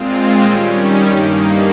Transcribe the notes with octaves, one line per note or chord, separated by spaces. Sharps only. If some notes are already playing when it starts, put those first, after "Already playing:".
Already playing: A#2 G#3 C4 F4
D#3 G3 C#4
G2 D#3 A#3